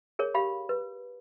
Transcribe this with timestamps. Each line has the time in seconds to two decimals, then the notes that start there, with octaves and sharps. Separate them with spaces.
0.19 G#4 A#4 C#5
0.34 G4 F5 B5
0.69 B4